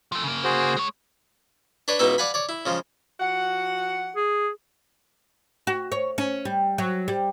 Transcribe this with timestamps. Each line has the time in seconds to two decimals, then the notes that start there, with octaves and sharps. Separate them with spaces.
0.12 F3 A3
0.23 C#3 A#3
0.44 F#4 G#4 C5
0.77 G#3 C#5
1.88 D4 B4 C#5 D5
1.99 C#2 B2 B3 D#4 E4 E5
2.18 D5 F5 F#5 G#5 B5
2.34 C#5 D5
2.49 E4
2.66 C#3 F3 G#3
3.20 F3 F#4 F#5
4.16 G#4
5.67 F#4
5.92 C#5
6.18 C#4
6.45 G3
6.78 F#3
7.08 G3